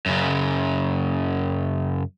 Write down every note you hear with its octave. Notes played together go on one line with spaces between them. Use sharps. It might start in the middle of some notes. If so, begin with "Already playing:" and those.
F#2 C#3